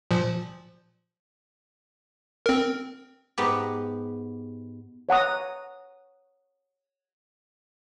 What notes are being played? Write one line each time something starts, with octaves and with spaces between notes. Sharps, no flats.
A#2 F3
C4 A#4
G#2 B3 G4
C#5 F#5 A#5 D#6